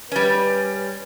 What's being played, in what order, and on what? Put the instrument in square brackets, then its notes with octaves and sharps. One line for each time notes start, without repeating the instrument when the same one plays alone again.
[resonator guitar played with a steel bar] G3 C#4 [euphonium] B4